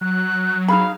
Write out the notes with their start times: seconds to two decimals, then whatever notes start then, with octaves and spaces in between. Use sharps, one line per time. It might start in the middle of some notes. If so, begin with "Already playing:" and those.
0.01 F#3 F#6
0.68 D#4 G#4 F5 B5